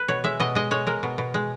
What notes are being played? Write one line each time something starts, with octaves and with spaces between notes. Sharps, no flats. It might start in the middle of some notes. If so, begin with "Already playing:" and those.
Already playing: B4
B2 C#5
G#3 E5
B2 D#5
G#3 D#5
G#3 C#5
G#3 A#4
B2
B2
G#3